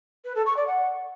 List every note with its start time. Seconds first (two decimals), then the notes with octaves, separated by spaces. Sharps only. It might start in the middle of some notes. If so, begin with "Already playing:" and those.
0.25 B4
0.35 A4
0.46 C#6
0.57 D5
0.67 F#5